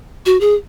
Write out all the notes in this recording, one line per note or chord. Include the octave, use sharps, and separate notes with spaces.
F#4
G#4